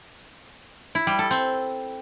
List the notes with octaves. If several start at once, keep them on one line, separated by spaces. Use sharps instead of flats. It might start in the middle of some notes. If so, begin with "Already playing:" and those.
E4
G3
A4
C4